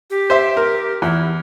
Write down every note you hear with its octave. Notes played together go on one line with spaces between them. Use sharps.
G4
C5 E5
A#4
E2 E4